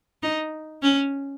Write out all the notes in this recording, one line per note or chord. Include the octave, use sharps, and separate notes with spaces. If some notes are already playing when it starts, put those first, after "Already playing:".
D#4
C#4